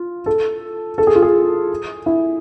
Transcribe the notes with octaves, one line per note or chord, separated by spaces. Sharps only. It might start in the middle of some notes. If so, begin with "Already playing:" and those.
Already playing: F4
A4
A4
G#4
F4
G#4
E4